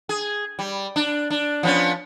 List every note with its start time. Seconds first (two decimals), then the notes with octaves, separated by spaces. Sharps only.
0.09 G#4
0.59 G3
0.96 D4
1.30 D4
1.63 F3 B3 C#4